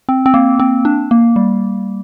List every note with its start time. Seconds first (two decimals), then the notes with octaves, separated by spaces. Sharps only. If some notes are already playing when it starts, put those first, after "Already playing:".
0.09 C4
0.26 C4
0.34 A#3
0.59 C4
0.85 D4
1.11 A#3
1.36 G3